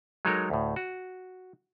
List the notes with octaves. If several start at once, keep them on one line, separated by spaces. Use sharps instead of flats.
F#3 G#3 D#4 A4 A#4 C#5
D2 A2
F#4